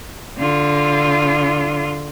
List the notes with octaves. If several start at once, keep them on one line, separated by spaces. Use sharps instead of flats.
D3 F4